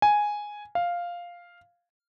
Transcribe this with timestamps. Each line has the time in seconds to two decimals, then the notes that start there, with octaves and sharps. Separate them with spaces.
0.02 G#5
0.75 F5